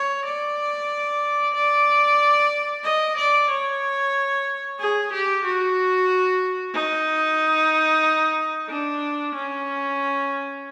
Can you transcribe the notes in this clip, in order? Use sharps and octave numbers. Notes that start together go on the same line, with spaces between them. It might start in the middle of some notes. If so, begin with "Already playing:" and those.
Already playing: C#5
D5
D5
D#5
D5
C#5
G#4
G4
F#4
D#4
D4
C#4